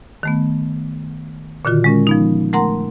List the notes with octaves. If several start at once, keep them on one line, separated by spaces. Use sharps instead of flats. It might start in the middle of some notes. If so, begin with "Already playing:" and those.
D#3 A3 B3
A#2 D3 D#3 F4 F#4
G#3 C#4 A#4
F3 B3 D#4
A3 A#4 F#5 A#5 C6